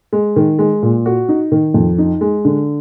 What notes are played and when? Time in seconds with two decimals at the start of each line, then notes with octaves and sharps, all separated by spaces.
0.13 G#3
0.36 D#3
0.59 G#3
0.82 A#2
1.06 F#4
1.29 D#4
1.52 D#3
1.74 F2
1.98 D#4
2.21 G#3
2.45 D3